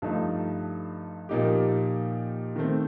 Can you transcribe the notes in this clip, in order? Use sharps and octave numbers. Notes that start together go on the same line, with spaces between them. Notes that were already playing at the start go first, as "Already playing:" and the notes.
G2 F3 A3 D#4
A#2 F3 A#3 D#4 G4
D#3 A3 C4